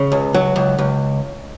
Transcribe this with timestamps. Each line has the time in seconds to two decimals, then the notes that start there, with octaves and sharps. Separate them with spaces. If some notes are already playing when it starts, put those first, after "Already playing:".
Already playing: C#3
0.12 C#2
0.34 F#3
0.56 C#2
0.79 C#2